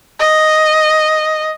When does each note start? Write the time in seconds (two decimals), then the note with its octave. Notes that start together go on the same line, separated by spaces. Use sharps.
0.20 D#5